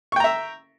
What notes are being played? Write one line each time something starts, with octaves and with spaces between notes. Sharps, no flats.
E5 G5 A#5 C#6